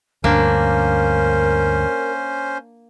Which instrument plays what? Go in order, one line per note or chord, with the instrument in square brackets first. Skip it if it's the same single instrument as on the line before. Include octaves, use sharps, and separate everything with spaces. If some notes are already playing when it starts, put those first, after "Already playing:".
[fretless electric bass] D2 G2 [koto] A#3 D4 [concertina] C#4 C5 [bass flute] A#4